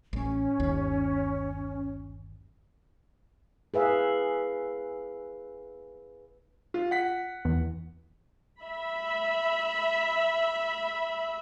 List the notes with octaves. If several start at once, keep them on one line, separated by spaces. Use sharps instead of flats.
A1 C#4
G1 D#2
G#4 B4 E5 F5
F4
F#5 B6
E2
E5 B5